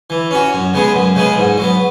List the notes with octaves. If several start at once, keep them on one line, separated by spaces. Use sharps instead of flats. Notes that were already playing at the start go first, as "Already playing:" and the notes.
E3
C#4 F#4
F#2
C#3 G#3 B3 G#4
F#2
C#3 G#3 B3 G#4
G#2
F#3 B3